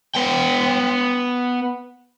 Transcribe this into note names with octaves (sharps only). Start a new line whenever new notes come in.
B3 G5